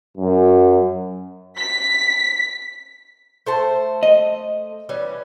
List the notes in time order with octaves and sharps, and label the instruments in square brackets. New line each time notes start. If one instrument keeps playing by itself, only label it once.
[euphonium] F#2
[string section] B6
[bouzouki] A3 C5 A5
[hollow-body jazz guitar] D#5
[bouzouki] E3 G3 C#4